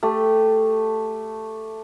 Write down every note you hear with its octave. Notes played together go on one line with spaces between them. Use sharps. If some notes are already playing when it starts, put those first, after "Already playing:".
A3 G4